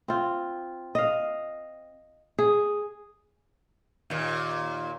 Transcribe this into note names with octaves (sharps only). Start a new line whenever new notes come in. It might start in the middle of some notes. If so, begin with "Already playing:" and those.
C4 F4
D#5 F5
G#4
D#2 A#2